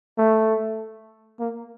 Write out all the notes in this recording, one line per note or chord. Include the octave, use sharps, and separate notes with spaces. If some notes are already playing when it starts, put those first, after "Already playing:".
A3
A#3